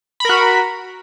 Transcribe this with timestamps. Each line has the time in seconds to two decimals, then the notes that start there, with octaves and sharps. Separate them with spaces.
0.20 B5
0.25 A#4
0.29 F#4